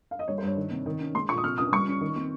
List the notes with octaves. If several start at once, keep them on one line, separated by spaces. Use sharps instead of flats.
F5
D#5
G3 C#5
C5
G2 C#5
D#3
C3
D#3
C#4
G#3 C6
A#2 C#6
D#6
C3 F6
C#2 D#6
G3 C#6
C#4
D#3
C4